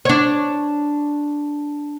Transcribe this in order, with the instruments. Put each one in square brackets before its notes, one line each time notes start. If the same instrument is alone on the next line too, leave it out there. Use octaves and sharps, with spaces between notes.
[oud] D4 C#5